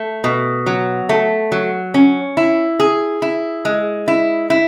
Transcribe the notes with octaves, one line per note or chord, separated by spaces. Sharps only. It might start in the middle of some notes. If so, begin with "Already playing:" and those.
Already playing: A3
B2
F#3
A3
F#3
C#4
E4
G#4
E4
G#3
E4
E4